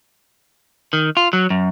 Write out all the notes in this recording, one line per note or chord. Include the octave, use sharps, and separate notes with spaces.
D#3
F4
F#3
F#2